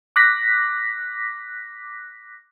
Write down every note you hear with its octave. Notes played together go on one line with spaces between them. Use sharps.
D6 F#6 A#6 B6